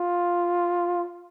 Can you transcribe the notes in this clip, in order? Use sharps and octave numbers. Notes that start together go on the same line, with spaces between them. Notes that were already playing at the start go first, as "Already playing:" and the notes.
Already playing: F4